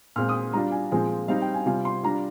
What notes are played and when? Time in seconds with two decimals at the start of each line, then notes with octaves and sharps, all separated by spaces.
0.16 A#2 G#3 C4 F6
0.29 D#6
0.53 G3 D4 F4 A#5
0.72 G#5
0.92 A#2 F3 G#3 C4 F4 G#5
1.28 G3 C4 D#4 F5
1.42 G5
1.54 G#5
1.66 C3 G3 C4 F4 G#5
1.85 C6
2.03 G3 D4 F4 A#5